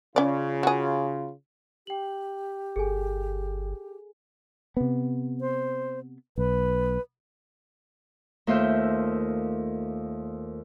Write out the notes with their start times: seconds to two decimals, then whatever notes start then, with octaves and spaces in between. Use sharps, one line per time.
0.16 C#3 C#4 F4 D5
0.63 F#4 G#4
1.87 G4 G5 F#7
2.76 G1 G#4 A4 G#5
4.77 C3 B3
5.41 C5
6.38 B1 B4
8.47 D#2 A3 F4 C5 E5 G6